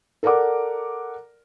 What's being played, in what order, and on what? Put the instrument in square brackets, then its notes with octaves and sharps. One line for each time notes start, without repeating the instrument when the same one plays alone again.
[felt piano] A4 A#4 D5 F#5 D6